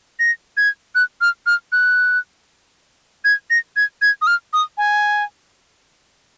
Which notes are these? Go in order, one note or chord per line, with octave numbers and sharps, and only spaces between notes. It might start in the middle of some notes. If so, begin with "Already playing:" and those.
A#6
G#6
F#6
F6
F6
F#6
G#6
A#6
G#6
G#6
D#6
F6
D#6
G#5